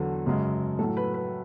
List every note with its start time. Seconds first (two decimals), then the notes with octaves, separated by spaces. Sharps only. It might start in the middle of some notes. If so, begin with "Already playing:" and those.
Already playing: E2 D3 F#3 A4
0.26 F#2 C#3 G#3
0.79 A2 F#3 A4
0.97 B4
1.14 B4